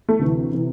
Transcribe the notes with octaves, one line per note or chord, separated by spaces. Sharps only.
A3
D2 C3 E3
C3 E3